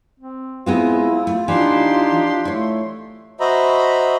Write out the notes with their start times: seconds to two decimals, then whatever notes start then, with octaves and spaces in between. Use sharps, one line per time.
0.20 C4
0.66 G#3 B3 C4 E4 F4
1.27 A3
1.48 E3 D4 D#4 G4 C6
2.45 A3 E4 C#5
3.40 F#4 C5 D#5 E5 A#5 B5